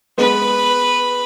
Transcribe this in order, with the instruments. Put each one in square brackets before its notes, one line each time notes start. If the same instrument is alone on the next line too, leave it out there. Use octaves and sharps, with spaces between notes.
[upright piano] G#3 B3 [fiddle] B4